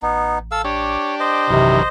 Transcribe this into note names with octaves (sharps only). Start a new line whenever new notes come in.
A1 B3 D#4
A4 F5 E6
D4 G4 C#5
C5 D#5
A#1 F#2 C3 D#3 E3